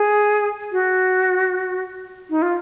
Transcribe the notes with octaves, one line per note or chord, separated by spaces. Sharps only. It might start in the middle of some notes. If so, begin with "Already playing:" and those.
Already playing: G#4
F#4
D#4
F4